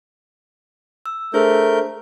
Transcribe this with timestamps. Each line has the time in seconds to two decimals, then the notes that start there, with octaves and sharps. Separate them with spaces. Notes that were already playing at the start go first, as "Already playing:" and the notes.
1.06 E6
1.34 A3 D4 G#4 A#4 C5 G6